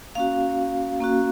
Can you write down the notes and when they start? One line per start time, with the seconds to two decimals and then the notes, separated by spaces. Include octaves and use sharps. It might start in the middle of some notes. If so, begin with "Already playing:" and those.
0.15 A#3 C#4 F#4 F5
1.00 A#3 C#4 F#4